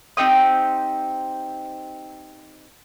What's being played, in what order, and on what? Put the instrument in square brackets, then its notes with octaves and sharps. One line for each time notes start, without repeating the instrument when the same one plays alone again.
[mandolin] C4 D#4 G4 D#6